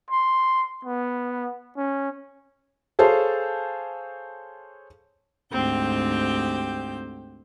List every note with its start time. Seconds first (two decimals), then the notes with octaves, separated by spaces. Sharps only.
0.11 C6
0.85 B3
1.77 C#4
2.99 G#4 A4 C5 C#5 F5 A5
5.52 D2 G#2 C4 G4 G6